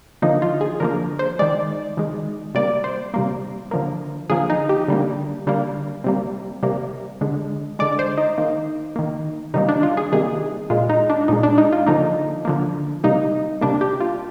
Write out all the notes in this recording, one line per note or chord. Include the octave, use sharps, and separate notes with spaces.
D3 F3 A#3 D#4
F4
G#4
D3 F3 A#3 A#4
C5
D#3 G#3 D5
D#3 G#3
C3 G3 A#3 D5
C5
C3 G3 A#3
D3 F3 A#3
D3 F3 A#3 G#4
D#4
G4
D3 G3 A#3
D3 G3 A#3
C3 G3 A#3
C3 G3 A#3
D3 G#3
D3 G#3 D5
C5
D#4
D#3 A#3
D#3 A#3
C3 D#3 G3 A#3 D#4
D4
F4
G#4
C3 D#3 G3 A#3 G#4
A#2 G#3 F4
D#4
D4
A#2 G#3 D#4
D4
D#4
F4
D3 F3 A#3 D#4
D3 F3 A#3
C3 G3 A#3 D#4
C3 G3 A#3 D4
G4
F4